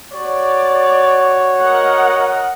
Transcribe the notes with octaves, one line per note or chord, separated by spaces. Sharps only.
F#4 C#5 D5
A#4 D#5 F#5